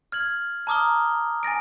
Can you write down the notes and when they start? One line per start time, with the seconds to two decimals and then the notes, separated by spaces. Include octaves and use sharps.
0.12 F6 G#6 F#7
0.67 A5 A#5 D6 D#6 F6 G7
1.43 G#5 A6 A#6 D7